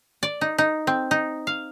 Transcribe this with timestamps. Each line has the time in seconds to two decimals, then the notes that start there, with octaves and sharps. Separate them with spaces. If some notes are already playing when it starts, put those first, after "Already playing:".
0.23 D5
0.41 D#4
0.58 D#4
0.87 C4
1.11 D#4
1.47 F5